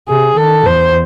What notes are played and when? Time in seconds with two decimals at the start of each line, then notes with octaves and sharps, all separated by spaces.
0.09 C3 G#4
0.37 D#3 A4
0.65 E2 C5